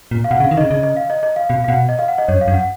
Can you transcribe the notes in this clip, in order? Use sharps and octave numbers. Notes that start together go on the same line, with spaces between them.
A#2
F5
B2 F#5
C#3
F5
D#3
D#5
C#3
C#3 D#5
D#5
F5
D#5
D#5
F5
B2 F5
F5
B2 F#5
D#5
F5
F#5
D#5
F#2 C#5
F5
F#2
F#5